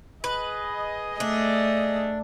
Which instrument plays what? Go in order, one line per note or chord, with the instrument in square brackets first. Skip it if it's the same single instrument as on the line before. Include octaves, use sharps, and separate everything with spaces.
[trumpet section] G#4 D#5 [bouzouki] B4
[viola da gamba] A3 [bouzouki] D4